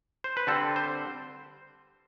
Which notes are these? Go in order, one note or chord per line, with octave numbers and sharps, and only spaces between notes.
C5
B4
D3 G3 C4 A4
C5